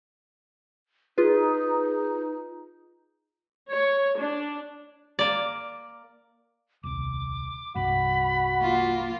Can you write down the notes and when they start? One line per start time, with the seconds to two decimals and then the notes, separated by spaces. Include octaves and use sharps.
1.18 D#4 F4 G#4 B4
3.72 C#5
4.19 D4
5.19 A#3 D5
6.83 D#1 C2 D6
7.75 G1 C2 G2 F#4 B5
8.62 A#3 F4